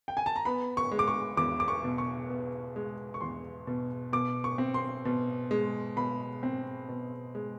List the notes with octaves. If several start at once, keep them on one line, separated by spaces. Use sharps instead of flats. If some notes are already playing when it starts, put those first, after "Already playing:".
G5
G#5
A5
A#5
B3 B5
C#6
G#3
D6
C#6
E2 D6
D6
C#6
B2
C#6
B3
G#3
C#6
E2 C6
B2
B2 D6
C#6
C4
C6
B2
G#3
B2 B5
C4
B2
G#3